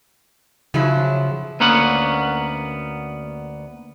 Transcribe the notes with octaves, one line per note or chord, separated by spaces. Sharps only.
C#3 F3 F#3 E4
D2 A#3 B3 C#4 F#5